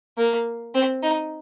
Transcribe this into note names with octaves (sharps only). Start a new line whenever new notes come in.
A#3
C4
D#4